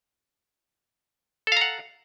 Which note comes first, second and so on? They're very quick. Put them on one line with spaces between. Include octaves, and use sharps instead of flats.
A4 F5 A#5 F#5